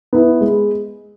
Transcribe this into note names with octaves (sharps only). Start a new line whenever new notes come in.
B3 E4
G#3